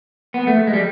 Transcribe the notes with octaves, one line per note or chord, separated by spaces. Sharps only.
B3
A3
G#3
G3